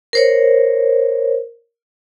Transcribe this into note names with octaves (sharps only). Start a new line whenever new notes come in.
A#4 C5 C#5